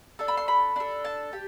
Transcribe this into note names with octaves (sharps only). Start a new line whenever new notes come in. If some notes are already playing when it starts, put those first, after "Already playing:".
D4 A4 A5
B5
C6
B5
D4 A4
A5
G4